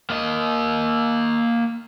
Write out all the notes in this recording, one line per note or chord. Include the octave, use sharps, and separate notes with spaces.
A#3 D#5